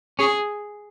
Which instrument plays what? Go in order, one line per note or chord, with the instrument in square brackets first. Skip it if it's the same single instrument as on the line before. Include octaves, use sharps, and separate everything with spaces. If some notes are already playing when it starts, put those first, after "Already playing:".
[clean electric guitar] C#4 [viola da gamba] G#4